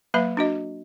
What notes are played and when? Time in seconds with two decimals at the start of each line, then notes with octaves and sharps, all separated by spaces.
0.14 F#3 A#3 B4 E5 B5
0.37 D4 F#4 D#5